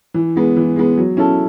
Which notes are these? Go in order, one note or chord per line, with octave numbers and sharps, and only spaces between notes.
E3
G#3 B3
E3
G#3 B3
F#3
C#4 E4 A4